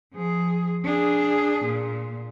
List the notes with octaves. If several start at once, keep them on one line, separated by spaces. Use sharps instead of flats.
F3 G#4
D4 G#4
A#2